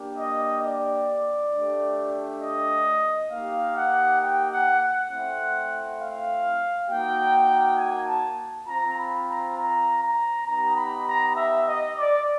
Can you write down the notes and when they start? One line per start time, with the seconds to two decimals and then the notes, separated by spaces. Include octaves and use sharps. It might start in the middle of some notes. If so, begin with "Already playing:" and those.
Already playing: A#3 D4 G4
0.16 D#5
0.61 D5
1.51 A3 D4 G4
2.40 D#5
3.30 A#3 D#4 G4 F5
3.74 F#5
4.19 G5
4.49 F#5
4.79 F#5
5.08 A3 C4 E4
5.98 F5
6.88 A#3 D#4 F#4 G5
7.77 G#5
8.07 A5
8.66 C4 F4 A#5
8.97 B5
9.26 A#5
9.57 A#5
10.02 A#5
10.45 B3 D#4 G4 A#5
10.75 B5
11.06 A#5
11.35 E5
11.65 D#5
11.95 D5